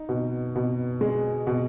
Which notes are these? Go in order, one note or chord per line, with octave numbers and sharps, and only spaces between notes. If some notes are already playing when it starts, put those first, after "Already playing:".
Already playing: D#4
B2
B2
G#3
B2